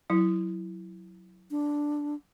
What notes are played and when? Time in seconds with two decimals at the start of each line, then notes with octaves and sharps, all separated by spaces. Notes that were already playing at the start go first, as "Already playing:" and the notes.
0.10 F#3 E4
1.51 D4